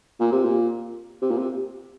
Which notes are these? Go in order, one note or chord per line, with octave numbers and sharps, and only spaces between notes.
A#2
C3
A#2
C3
A#2
C3